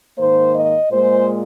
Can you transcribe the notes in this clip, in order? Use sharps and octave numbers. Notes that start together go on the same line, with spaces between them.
G#2 D#3 A#3 C5
D#5
A#2 G#3 C5